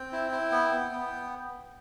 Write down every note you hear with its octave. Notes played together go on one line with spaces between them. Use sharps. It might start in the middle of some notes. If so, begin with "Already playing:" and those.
Already playing: C4 G5
E4
E4
B3
B3
B3